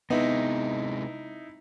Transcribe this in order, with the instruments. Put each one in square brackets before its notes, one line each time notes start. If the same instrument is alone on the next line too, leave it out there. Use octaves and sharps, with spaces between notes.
[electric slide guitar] C3 G#3 [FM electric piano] B3 [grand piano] D#4 E4